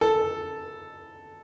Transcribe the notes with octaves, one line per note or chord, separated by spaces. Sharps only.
A4